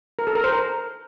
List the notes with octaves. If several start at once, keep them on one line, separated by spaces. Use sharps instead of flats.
A#4
A4
A#4
C5
A#4